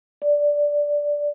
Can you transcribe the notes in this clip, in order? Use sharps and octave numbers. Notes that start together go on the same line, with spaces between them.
D5